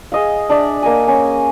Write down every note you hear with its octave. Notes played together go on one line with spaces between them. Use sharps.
G#4 D#5 F5
D4 D5 E5
A#3 D#5 G#5
C#4